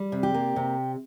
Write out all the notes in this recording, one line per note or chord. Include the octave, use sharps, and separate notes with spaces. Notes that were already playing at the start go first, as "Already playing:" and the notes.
Already playing: G3
C3
G4
A#3
C3